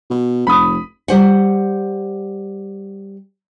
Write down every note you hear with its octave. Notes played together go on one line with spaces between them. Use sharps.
B2
F1 B5 D#6
G3 C5 F#5